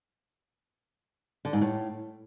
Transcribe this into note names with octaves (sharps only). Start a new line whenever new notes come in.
D3
G#2
A2